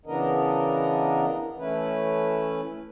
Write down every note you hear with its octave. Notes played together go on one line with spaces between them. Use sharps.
C#3 E3 B3 D4 A#4 D#5
E3 A3 C#4 E4 B4